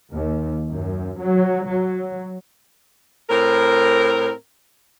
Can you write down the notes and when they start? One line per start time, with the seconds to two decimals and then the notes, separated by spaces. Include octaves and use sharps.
0.11 D#2
0.70 F#2
1.21 F#3
1.68 F#3
3.30 A2 C4 A#4